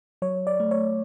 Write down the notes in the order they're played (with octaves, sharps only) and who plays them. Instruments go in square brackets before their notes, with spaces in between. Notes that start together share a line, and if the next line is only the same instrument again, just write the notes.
[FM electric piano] F#3 C#5
D5
A3
C#5